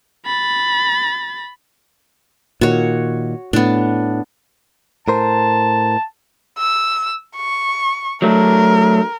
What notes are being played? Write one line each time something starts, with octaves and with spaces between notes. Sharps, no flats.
B5 A6
A#2 D#3 F#4 C#5
A2 B3 D4
A2 A#4 C5 A5
E6
C#6
F#3 A3 D4 A#4